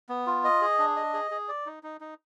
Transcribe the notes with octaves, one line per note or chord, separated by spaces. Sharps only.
B3
F4
D#5
G#4
D4
D#5
G#4
G#4
D5
D#4
D#4
D#4